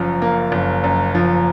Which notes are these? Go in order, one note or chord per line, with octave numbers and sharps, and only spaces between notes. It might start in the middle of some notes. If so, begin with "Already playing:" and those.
Already playing: F#1 F#2 F3
A#3
F#1
F#2
F3